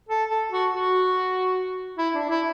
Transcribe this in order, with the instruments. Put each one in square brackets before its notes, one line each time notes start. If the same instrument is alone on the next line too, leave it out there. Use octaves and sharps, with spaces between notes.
[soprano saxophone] A4
A4
F#4
F#4
E4
D4
E4